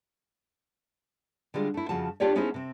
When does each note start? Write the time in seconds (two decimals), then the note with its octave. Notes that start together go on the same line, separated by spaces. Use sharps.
1.54 D3 G3 G#3 F4
1.74 A3 E4
1.89 F2 C#3 F3 F#4 A5
2.20 D4 F4 G4 A4 C#5 D5
2.35 B3 C#4 D#4 E4 G#4 C5
2.54 C3 C4